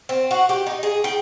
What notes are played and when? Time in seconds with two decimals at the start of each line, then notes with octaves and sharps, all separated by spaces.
0.09 C4
0.31 F#4
0.49 G4
0.66 D#4
0.83 G#4
1.04 G5